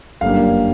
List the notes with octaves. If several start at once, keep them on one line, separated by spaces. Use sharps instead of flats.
G1 F#2 D3 G3 A#3 F5